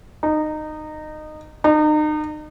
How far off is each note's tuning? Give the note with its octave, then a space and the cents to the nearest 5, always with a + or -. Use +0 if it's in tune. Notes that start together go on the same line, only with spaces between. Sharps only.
D#4 -20
D#4 -35